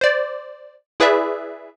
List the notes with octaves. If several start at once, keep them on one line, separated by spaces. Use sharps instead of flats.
C5 D5
E4 G#4 B4 D5 E5